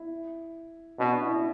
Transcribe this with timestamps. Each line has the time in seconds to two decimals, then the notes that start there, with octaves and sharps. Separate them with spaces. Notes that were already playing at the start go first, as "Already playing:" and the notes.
Already playing: E4
0.99 B2 C#4
1.11 D4
1.22 E4
1.33 E4